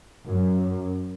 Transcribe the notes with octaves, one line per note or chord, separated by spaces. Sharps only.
F#2